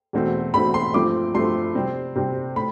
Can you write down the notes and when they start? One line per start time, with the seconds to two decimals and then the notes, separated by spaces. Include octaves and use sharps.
0.13 E2 B2 A3 C4
0.54 E2 B2 A3 C4 B5
0.74 C6
0.94 G2 F3 A3 C4 D6
1.34 G2 F3 A3 C4 C6
1.75 C3 G3 C4
2.16 C3 G3 C4
2.56 A2 B5